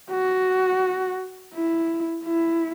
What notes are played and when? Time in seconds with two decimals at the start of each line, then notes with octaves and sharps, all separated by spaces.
0.11 F#4
1.54 E4
2.25 E4